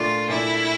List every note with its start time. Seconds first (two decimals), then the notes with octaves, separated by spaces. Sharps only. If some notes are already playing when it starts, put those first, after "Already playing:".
Already playing: A#2 A3 D4 F4
0.28 A#2 A3 D4 E4